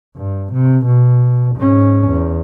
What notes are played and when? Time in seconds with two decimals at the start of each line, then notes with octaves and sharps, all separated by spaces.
0.16 G2
0.53 C3
0.86 B2
1.56 G#2 C#4
2.10 E2